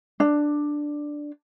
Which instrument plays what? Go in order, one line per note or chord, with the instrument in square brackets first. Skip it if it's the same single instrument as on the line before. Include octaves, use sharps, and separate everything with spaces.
[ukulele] D4